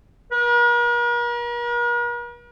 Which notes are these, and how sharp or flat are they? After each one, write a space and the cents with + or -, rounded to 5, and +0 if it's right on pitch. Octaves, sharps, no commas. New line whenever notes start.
A#4 +45